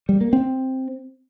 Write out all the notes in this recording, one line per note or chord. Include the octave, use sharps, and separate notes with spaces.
G3
A#3
C4